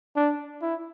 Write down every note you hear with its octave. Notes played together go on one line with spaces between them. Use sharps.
D4
E4